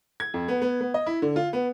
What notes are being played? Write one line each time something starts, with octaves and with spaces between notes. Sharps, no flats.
G#6
F2
B3
B3
B3
D#5
E4
D3
F4
B3